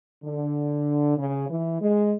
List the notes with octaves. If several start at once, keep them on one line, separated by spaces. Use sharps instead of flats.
D3
C#3
E3
G#3